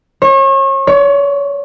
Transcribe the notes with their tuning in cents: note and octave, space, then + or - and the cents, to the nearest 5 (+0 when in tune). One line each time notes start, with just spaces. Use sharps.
C#5 -35
C#5 +35